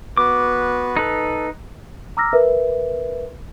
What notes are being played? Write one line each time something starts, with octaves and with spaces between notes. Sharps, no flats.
B3 F#4 B4 D6
D#4 A4 B4
A#5 D6 E6 F6 A#6
A#4 B4 E5